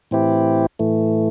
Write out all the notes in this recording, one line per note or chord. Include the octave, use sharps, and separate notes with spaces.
A2 E3 C4 E4 G4
A2 E3 A3